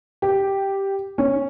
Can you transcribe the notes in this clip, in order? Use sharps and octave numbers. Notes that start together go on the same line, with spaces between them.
G4
C#4